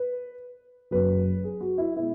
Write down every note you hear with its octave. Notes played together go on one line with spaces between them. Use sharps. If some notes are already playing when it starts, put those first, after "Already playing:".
Already playing: B4
F#1 F#2 F#3 B4
G#4
F#4
E4
B2 G#3 E4